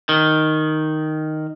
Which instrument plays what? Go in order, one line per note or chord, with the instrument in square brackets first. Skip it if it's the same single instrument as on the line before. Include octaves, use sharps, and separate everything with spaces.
[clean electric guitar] D#3